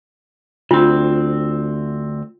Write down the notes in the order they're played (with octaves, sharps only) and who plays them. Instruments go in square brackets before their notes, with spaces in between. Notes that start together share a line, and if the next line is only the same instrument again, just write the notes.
[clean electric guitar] D2 C4 [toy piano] F4